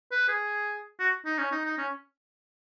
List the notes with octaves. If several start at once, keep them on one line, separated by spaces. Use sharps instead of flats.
B4
G#4
F#4
D#4
C#4
D#4
D#4
C#4